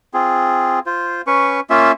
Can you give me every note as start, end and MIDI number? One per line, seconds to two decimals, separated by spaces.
0.14 0.79 60
0.14 0.79 65
0.14 0.79 68
0.86 1.22 65
0.86 1.22 72
1.27 1.60 61
1.27 1.60 71
1.27 1.60 85
1.70 1.92 58
1.70 1.92 61
1.70 1.92 65
1.70 1.92 76